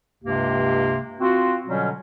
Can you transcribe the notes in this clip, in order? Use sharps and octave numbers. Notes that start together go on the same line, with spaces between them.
C#2 G2 C3 A#3 G4
C4 F4 F#4
B2 D3 F#3 G3 C#4